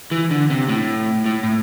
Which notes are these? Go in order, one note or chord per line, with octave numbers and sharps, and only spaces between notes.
E3
D3
C3
A2
A2
A2